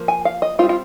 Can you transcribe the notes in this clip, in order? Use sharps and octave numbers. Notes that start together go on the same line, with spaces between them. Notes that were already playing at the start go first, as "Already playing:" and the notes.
Already playing: F3 A#3
G#5
F5
D#5
G3 C4 D#4 F4
F4